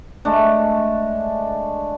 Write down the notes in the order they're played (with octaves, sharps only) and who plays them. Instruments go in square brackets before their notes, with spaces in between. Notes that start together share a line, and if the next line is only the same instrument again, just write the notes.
[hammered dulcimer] G#3 A3 D4